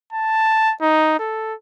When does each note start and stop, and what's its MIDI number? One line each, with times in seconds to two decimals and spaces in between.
0.13 0.73 81
0.81 1.15 63
1.19 1.54 69